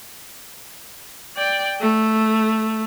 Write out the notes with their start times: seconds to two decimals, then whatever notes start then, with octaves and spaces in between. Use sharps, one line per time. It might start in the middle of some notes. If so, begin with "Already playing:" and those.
1.37 D5 G5
1.81 A3